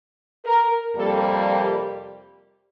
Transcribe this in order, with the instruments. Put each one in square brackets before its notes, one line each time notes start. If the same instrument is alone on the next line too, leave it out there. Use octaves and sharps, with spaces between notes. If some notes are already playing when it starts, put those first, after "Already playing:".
[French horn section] A#4
F2 C3 G3 A#3 A4
G4